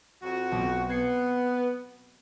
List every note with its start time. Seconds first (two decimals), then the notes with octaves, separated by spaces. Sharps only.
0.23 F2 F#4
0.51 B1 C4
0.89 B3 G#6 C7 C#7